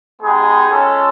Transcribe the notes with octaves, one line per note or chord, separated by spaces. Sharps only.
G#3 B3 D#4 G4 G#4
G#3 C#4 F4 A4